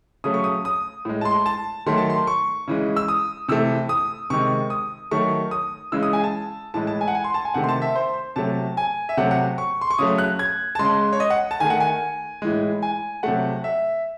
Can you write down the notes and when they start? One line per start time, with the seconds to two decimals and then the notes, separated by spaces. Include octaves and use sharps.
0.24 C#3 F#3 A3 D#6
0.34 C#6
0.44 D#6
0.65 D#6
1.05 A2 G#3
1.21 A5
1.25 C6
1.46 A5
1.86 D#3 F#3 A3 C6
1.98 A5
2.10 C6
2.27 C#6
2.68 C#3 E3 G#3
2.96 E6
3.08 D#6
3.48 C3 E3 A3 E6
3.89 D#6
4.30 C3 D#3 G#3 C#6
4.70 D#6
5.11 D#3 F#3 A3 C#6
5.51 D#6
5.92 C#3 E3 G#3 E6
6.03 D#6
6.13 G#5
6.24 A5
6.74 A2 E3 G#3 A5
6.87 A5
7.01 G#5
7.08 F#5
7.15 G#5
7.24 C6
7.34 A5
7.45 G#5
7.54 C3 D#3 A3 F#5
7.64 C6
7.69 A5
7.82 E5
7.95 C5
8.36 C3 F#3 A3 A5
8.77 G#5
9.09 E5
9.17 C3 F#3 A3 F#5
9.31 F#5
9.58 C#6
9.81 C6
9.91 C#6
9.98 C#3 F#3 A3 D#6
10.18 F#6
10.39 G#6
10.75 A5
10.79 C#3 G#3 C6
11.13 C#5
11.20 D#5
11.30 F#5
11.51 A5
11.60 D#3 A3 G#5
11.70 F#5
11.80 G#5
12.42 A2 E3 G#3
12.82 G#5
13.23 C3 F#3 A3 F#5
13.64 E5